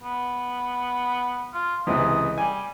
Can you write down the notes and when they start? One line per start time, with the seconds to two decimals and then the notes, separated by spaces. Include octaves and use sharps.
0.03 B3
1.54 F4
1.87 C#2 C3 E3 D#5
2.38 G3 G#5